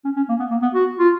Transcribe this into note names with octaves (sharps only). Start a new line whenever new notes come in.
C#4
C#4
A#3
B3
A#3
B3
F#4
F4